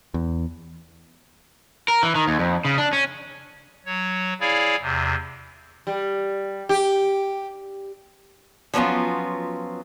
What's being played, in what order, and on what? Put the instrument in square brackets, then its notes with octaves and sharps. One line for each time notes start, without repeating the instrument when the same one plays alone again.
[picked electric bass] E2
[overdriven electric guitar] A#4
E3
D#3
D#2
F2
C#3
D4
C#4
[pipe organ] F#3 C#5
E4 G#4 C#5 D5 F5 G#5
E2 C3
[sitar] G3
G4
[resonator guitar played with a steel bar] F3 F#3 B3 C#4 F4